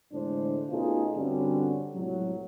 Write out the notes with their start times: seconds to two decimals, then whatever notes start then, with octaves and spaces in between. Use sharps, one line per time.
0.12 E2 A2 D3 G#3 D4 C5
0.70 B2 A3 C#4 D#4 F4 G#4
1.15 G2 D3 G3 C4 C#4 F#4
1.94 C#2 A2 C3 F#3